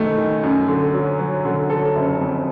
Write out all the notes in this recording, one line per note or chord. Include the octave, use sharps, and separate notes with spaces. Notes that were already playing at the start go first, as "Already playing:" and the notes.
Already playing: F#2 D#3 A3
D#3
F#2
D3
F#3
F#3
D3
F#3 A4
F#1
F2